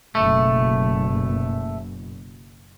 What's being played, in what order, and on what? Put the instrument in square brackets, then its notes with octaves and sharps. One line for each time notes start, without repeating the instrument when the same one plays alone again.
[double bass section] F#1 B2 [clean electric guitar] A3